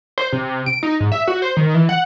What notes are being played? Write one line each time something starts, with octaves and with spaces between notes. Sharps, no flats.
C5
C3
D7
D#4
G#2
E5
F#4
C5
D#3
E3
F#5